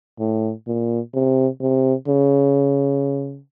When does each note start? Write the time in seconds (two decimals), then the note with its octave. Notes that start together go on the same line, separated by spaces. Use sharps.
0.19 A2
0.67 A#2
1.14 C3
1.61 C3
2.08 C#3